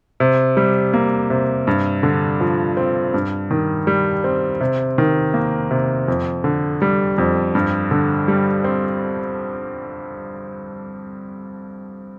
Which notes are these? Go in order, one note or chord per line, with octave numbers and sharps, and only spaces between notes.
C3
G3
A#3
C3
G2
D3
F3
C4
G2
D#3
G3
C4
C3
D#3
A#3
C3
F2
D3
G3
F2
G2
D3
G3
C4